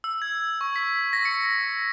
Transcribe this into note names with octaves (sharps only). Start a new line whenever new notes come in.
E6
G#6
C#6
B6
A#6
C#7